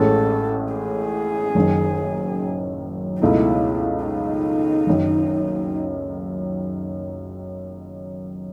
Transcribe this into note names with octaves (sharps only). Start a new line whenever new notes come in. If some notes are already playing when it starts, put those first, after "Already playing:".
Already playing: A1 A2 G#3 C#4 A4
G#4
F#1 F#2 D#3
C#2 B2 A3 D#4 E4
D#4
F#1 F#2 D#3